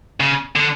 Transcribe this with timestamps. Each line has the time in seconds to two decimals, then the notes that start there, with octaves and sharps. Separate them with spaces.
0.20 C#3
0.56 D3